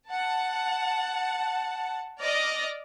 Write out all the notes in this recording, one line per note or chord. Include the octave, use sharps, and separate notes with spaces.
F#5 A5
D5 D#5 F6 A#6